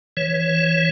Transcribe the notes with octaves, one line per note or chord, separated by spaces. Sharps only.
E3 C#5